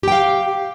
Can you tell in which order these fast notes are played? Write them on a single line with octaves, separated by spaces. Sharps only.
G4 G5 F5